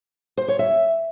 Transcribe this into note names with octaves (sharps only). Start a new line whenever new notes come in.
C5
C#5
E5